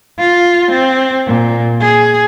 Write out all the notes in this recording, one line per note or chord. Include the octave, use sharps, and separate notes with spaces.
F4
C4
A#2
G#4